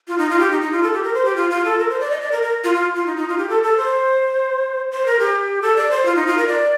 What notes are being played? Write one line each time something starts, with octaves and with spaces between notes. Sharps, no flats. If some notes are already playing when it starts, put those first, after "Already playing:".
F4
D#4
F4
G4
D#4
D#4
F4
A4
G4
A#4
C5
G4
F4
F4
A4
A#4
C5
D5
D#5
D5
A#4
A#4
F4
F4
F4
D#4
D#4
F4
G4
A4
A4
C5
C5
A#4
G4
A4
D5
C5
F4
D#4
F4
A#4
D5